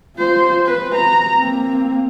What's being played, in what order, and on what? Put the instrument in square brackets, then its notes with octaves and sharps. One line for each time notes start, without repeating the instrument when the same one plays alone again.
[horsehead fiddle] F4 C5
B4
A#5
A#3 C4